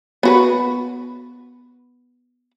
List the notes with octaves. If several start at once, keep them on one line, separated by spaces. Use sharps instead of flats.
B3 F#4 B4